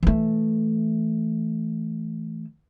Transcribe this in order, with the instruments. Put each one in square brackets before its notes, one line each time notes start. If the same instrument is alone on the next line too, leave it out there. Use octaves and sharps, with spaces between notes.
[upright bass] E3 A3